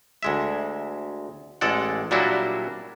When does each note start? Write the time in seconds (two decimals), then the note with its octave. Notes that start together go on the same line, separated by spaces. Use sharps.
0.23 D2 G#3 E5
1.61 A1 G#3 A4 D5 F#5
2.11 A#2 F#3 G3 D4 E4 F#4